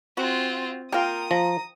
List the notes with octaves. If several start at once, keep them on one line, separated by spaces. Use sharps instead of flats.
C4 F4 F#4
A#3 F4 A#4 G5 D#6
F3 A#5